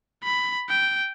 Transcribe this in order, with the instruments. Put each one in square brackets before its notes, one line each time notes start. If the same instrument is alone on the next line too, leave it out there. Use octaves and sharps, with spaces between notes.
[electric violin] B5
G5